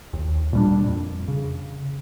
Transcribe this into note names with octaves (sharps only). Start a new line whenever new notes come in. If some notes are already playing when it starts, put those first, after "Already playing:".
D#2
A#2 G3 D4
F2
C#3